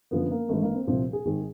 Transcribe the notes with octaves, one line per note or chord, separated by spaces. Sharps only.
F#1 F#2 D3 F3 B3
A#3
G#1 G2 E3 A3
A#3
C4
C2 A#2 F3 C4
G#4
G#1 G#2 D#3 G#4